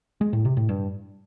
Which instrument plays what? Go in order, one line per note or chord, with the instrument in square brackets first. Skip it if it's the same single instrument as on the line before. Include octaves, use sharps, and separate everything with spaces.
[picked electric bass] G#3
A2
C3
A2
G2